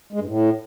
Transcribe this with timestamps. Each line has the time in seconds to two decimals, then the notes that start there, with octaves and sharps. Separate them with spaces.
0.13 G#3
0.20 G2
0.27 A2